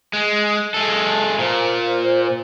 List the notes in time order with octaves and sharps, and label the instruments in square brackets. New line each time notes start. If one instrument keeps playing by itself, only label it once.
[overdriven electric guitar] G#3
G#3 A4
[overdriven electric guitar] A#2 [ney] C5